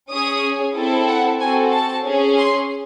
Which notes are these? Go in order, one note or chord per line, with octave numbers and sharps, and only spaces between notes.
C#4 G#4 D#6
C4 E4 A4
F#5
C4 F#4 A4 G#5
A5
C#4 G#4
C6